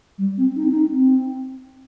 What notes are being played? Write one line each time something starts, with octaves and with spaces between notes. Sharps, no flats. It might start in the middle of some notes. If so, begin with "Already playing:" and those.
G3
C4
D#4
C4
D#4
C4